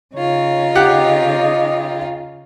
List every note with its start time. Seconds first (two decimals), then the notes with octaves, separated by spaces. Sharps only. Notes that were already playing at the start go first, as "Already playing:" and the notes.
0.15 C#3 D#4 F4 C#5
0.75 G4 D#5 F#5